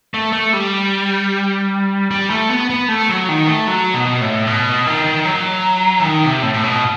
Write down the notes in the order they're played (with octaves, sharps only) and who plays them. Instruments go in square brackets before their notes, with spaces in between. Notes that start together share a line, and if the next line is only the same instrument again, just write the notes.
[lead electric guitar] A3
A3
G3
G3
A3
B3
B3
A3
F#3
D#3
A3
F#3
B2
A2
B2
D#3
F#3
E3
D#3
C3
A2
A2
B2